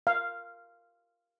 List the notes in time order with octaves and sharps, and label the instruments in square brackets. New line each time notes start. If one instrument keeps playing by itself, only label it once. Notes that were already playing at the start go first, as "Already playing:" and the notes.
[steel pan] F5